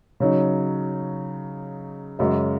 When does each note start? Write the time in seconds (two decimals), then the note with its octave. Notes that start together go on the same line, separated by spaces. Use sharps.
0.20 C#3 F#3 D#4
2.19 F#2 C#3 G#3 F#4 D#5